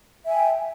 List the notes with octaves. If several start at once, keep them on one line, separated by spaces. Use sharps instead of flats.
E5 G5 G#5